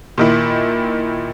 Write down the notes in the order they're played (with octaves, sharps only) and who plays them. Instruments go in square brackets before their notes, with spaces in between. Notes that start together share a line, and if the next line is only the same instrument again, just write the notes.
[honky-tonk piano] A#2 D#3 E4